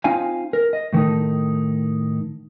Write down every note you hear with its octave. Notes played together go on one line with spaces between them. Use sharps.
C4 D#4 F4 F5 G#5
A#4
D#5
A2 D#3 A3 D#4